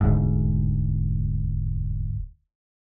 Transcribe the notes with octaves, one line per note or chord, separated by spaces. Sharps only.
E1 D2 G#2